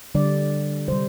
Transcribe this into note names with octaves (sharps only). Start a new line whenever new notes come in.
D3 G3 D5
C3 G3 C5